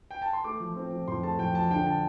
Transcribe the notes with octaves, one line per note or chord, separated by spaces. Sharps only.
G5
A5
C6
A3 D6
F3
C4
F3
F2 C6
A3 A5
F2 G5
F3 A5
D3 G5
A5